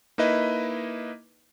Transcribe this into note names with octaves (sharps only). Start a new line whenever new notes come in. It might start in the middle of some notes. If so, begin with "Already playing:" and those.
A#3 D#4 E4 B4 D#5